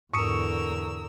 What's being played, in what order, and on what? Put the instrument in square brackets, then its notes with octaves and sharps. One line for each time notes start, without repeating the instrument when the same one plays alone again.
[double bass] E2 [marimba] G#2 [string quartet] D3 A#4 E6 [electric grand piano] C#6 D#6 C#7